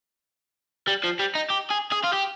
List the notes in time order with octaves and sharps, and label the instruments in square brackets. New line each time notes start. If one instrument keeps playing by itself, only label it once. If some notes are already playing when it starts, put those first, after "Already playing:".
[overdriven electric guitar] G3
F3
G3
D#4
G4
G#4
G#4
F4
G4